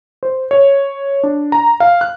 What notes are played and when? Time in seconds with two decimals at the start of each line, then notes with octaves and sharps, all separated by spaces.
0.23 C5
0.51 C#5
1.23 D4
1.52 A#5
1.80 F5
2.01 F#6